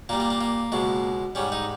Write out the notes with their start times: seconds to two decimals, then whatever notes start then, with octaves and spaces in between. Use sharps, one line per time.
0.09 A#2 A#3
0.13 G3
0.20 A#3
0.30 A#3
0.41 A#3
0.72 C#2 B2 G#3
1.35 G#2 G3 C#4
1.52 D#4